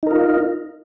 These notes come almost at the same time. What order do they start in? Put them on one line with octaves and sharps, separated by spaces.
D#4 A#4 F4